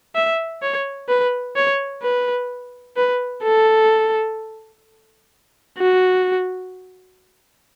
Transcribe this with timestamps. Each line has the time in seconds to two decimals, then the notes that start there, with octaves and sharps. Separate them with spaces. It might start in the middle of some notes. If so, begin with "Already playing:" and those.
0.15 E5
0.62 C#5
1.09 B4
1.56 C#5
2.02 B4
2.97 B4
3.43 A4
5.78 F#4